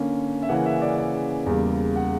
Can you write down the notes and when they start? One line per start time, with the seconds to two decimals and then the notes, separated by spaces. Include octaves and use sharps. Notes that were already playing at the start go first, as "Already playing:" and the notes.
Already playing: D3 A#3 C#4
0.42 E5
0.49 C#3 E3 A#3 C#4 F#5
0.66 E5
0.82 D5
0.98 D5
1.46 E2 C#3 G3 A#3
1.96 F#5